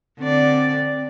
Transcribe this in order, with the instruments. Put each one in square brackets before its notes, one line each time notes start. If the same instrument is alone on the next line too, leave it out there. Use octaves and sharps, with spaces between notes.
[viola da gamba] D3 D5 [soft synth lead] C4